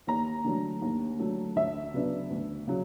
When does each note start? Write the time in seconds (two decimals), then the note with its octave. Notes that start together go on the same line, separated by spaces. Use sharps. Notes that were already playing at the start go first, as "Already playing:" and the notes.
0.07 D#2 A#5
0.44 D3 F#3 A3
0.82 D#2
1.19 D3 F#3 A3
1.56 D2 E5
1.94 C#3 F#3 B3 D4
2.31 D2
2.67 C#3 F#3